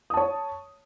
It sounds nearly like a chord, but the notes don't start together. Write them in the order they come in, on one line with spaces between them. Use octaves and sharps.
D#6 A5 C#5